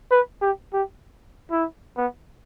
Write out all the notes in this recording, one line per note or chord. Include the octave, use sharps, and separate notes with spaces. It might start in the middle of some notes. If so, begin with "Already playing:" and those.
B4
G4
G4
E4
B3